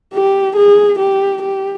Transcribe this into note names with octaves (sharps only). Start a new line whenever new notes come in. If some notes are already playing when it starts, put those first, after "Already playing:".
G4
G#4
G4
G4